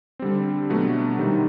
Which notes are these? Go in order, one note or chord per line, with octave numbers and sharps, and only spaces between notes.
D3 G3 C4
B2 F#3 A3 D4
C3 D#3 G3 C4 D#4